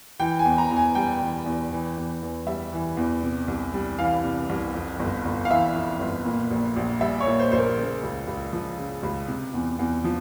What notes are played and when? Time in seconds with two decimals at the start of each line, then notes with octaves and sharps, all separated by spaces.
0.20 E3 G5
0.39 G#5
0.45 E2
0.58 A#5
0.71 E2
0.76 G#5
0.95 G3 G5
1.21 E3
1.46 E2
1.71 E3
1.97 E2
2.22 E2
2.47 G3 E5
2.73 E3
2.97 E2
3.23 C3
3.48 C2
3.74 G3
3.98 E3 F5
4.24 C3
4.49 C2
4.74 F2
4.99 G1
5.25 G1
5.45 F5
5.50 E3 E5
5.75 F2
6.00 G1
6.25 A#2
6.51 A#1
6.76 A#1
7.01 G3 E5
7.20 C#5
7.26 A#2
7.39 C5
7.52 A#1 C5
7.59 A#4
7.78 C#3
8.03 C#2
8.27 C#2
8.53 F3
8.78 C#3
9.03 C#2
9.28 C3
9.54 E2
9.79 E2
10.04 F3